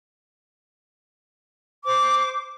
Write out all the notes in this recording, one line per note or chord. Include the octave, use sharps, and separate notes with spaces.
C5 D6